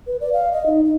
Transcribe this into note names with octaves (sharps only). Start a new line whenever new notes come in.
B4
D5
F5
D#5
D#4
D#4